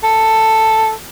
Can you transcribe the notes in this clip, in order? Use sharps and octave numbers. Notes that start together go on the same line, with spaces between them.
A4